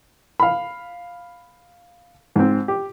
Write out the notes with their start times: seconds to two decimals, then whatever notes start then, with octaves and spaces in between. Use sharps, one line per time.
0.40 F5 B5
2.36 G#2 C4
2.68 G4